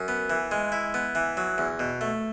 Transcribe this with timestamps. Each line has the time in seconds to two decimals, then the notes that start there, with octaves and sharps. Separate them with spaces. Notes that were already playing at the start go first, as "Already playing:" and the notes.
Already playing: F#2
0.08 B3
0.30 E3
0.51 G#3
0.72 E4
0.94 B3
1.15 E3
1.37 F#3
1.58 E2
1.79 B2
2.01 A3